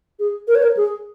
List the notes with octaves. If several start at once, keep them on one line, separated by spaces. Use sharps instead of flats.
G#4
A#4
C#5
A#4
G#4